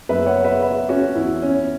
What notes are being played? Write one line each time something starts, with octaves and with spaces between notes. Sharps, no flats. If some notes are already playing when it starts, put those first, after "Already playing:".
F#1 F#2 F#3 B3 B4 E5
C#5 F#5
B4 E5
B4 E5
C#4 F#4
E2 E3 B3 E4
C#4